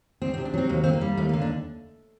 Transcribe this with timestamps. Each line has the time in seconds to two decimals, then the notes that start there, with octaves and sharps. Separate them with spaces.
0.22 D2 C4
0.34 C4
0.38 C3
0.45 D4
0.54 F#3 C4
0.69 D#2 A#3
0.84 D3 C4
0.93 A#3
1.01 G3
1.17 D#2 A3
1.29 A#3
1.33 D3
1.41 D4